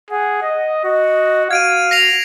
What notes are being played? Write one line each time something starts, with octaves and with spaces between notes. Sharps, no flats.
G#4 F#5
D#5
F#4 D#5
F#4 F5 G#6 D7 D#7
A#6 C7 F7